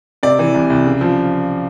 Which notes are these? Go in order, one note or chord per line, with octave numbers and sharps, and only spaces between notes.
C3 D5
E3
C2
C2
C#3
F3